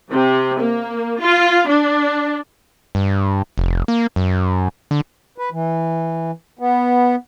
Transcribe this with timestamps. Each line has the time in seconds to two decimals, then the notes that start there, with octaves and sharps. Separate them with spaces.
0.12 C3
0.60 A#3
1.21 F4
1.68 D4
2.95 G2
3.58 F1
3.88 A#3
4.16 F#2
4.91 D3
5.38 B4
5.52 E3
6.59 B3